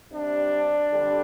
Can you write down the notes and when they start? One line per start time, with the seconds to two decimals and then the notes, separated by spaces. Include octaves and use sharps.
0.12 C3 G3 D4
0.91 F2 D3 G3